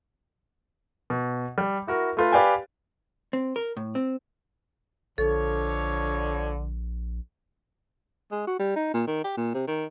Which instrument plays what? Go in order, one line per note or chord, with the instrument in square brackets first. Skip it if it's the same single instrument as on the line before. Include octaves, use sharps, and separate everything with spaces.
[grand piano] B2
G3
E4 F#4 A#4
A3 F4 B4
G4 B4 D5 F5 G5 G#5
[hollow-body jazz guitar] C4
A#4
A2
C4
[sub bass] A#1 [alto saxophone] D3 [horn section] F3 C#5 [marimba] A4
[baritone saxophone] G#3
F#4
G3
D#4
A#2
D#3
G4
A#2
C3
D#3